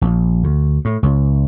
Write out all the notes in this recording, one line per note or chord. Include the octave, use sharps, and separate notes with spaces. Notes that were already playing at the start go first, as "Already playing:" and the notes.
A#1
D2
A2
C#2